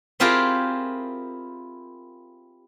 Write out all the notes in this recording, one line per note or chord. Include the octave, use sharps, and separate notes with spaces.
C4 E4 F4 G4 G#4 A#4